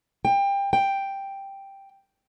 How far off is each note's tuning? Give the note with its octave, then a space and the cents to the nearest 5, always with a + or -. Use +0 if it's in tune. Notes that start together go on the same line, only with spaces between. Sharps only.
G5 +25
G5 +5